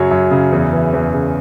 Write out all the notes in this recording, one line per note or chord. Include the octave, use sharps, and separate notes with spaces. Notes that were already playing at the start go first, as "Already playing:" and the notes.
Already playing: F#2 C#3 F#3 C#5
F#2
C#3
E2
E3
E2
C#3